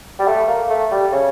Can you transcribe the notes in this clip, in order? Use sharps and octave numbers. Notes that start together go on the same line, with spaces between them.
G3
A3
A#3
A3
G3
C#3